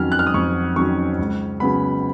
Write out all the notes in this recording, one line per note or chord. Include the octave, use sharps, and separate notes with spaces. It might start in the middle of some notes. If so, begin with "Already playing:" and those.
Already playing: F2 D#3 F#3 C#4 F6
F#6
F6
D#6
F2 C#6
D#3 F#3 C#4 C#6
C#2
C#3 F#3 B3 B5